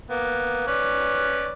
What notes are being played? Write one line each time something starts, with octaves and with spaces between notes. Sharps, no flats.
A#3 B3
C#4 B4 D5